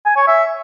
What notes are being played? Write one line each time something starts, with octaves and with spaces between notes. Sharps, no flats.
G#5
C#5
E5